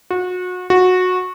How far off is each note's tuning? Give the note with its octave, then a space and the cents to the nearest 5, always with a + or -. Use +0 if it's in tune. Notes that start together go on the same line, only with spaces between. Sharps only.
F#4 -30
F#4 -15